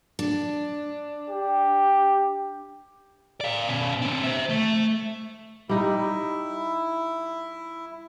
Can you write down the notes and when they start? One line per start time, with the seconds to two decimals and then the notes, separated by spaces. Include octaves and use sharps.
0.19 D4
1.30 G4
3.41 D5 F5
3.68 B2 C#4
4.02 C4 D4
4.23 C5 E5
4.50 A3
5.69 G3 D#4 E4